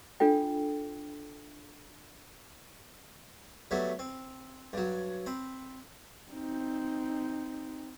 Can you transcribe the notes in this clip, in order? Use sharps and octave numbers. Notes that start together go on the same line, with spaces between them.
D4 F4 A4 G5
F#3 G3 A3 B3
C4
G2 F#3
C4 B5
C4 D#4